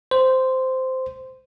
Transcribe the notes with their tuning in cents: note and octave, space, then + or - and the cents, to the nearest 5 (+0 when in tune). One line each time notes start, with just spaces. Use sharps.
C5 -10